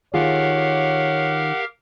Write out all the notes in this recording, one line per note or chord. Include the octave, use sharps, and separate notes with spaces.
D#3 F4 G4 G#4 A#4 C#5 F5 F#5